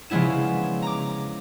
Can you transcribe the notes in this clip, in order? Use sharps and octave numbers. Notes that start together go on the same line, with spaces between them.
C#3 F3 G#3 B3 E4 E7
A#5 D6